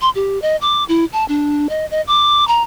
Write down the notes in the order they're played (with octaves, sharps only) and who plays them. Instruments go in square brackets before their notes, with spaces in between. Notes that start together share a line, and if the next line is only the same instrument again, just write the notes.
[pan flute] C6
G4
D#5
D6
E4
A5
D4
D#5
D#5
D6
A#5